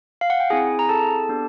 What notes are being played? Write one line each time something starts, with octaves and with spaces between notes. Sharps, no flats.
F5
F#5
G5
C4 E4 G#4 G#5
A#5
A4 A5
B3 D4 G4